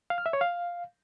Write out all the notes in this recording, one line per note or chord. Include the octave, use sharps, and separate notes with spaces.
F5
F6
E5
C#5
F5